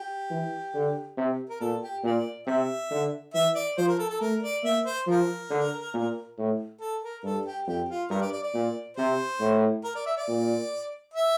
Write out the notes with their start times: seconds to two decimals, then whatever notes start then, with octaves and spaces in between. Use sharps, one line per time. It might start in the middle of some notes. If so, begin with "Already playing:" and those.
Already playing: G4
0.30 E3
0.74 D3
1.17 C3
1.49 A#4
1.61 A#2 A4
1.82 G4
2.04 A#2 D5
2.47 C3 E5
2.91 D3
3.34 E3 E5
3.55 D5
3.77 F3 C5
3.88 A#4
3.99 A4
4.09 A4
4.20 A3 A#4
4.42 D5
4.63 A#3 E5
4.86 C5
5.07 F3 A#4
5.50 D3
5.93 A#2
6.38 A2
6.81 A4
7.02 A#4
7.23 G2 A4
7.46 G4
7.67 F2 G4
7.89 F4
8.10 G2 A#4
8.21 D5
8.32 D5
8.43 D5
8.54 A#2
8.97 C3 C5
9.40 A2
9.84 A#4
9.95 D5
10.06 E5
10.17 D5
10.28 A#2
11.14 E5